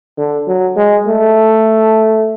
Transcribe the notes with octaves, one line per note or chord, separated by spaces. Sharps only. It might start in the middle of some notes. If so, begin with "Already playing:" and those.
D3
F#3
G#3
A3